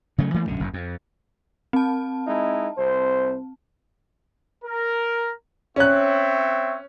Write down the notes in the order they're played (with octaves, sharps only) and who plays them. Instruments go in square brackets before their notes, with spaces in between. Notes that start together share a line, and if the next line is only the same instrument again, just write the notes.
[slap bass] C#3 F#3 A3
E3 A3 A#3
B1 F#2 D3
F#1 F#2
F2
[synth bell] C4 A5
[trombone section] G#3 D#4 E4
C2 C5
[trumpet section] A#4
[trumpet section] C4 C#5 E5 [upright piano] C#4 F#6